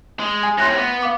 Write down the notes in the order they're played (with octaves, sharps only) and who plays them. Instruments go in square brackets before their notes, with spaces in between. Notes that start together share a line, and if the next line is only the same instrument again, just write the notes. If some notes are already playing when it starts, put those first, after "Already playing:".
[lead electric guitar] G#3
[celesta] G#5
[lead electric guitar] A2 C3 [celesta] C6 F#6 A#6
[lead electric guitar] B3
[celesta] F5 D6